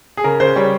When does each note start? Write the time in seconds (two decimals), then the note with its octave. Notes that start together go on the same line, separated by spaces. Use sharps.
0.17 G#4
0.24 C#3 A#4
0.40 C#3 C5
0.56 G3 C#5